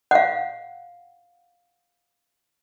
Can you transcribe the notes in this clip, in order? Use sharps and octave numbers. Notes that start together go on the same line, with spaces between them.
F5 F#5